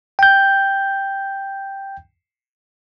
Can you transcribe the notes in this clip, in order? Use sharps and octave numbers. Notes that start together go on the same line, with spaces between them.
G5 G6